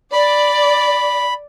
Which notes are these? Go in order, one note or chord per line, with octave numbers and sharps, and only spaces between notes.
D5 B5